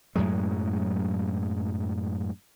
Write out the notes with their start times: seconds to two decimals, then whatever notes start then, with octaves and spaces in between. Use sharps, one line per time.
0.16 F#2 A2 F#3 G#3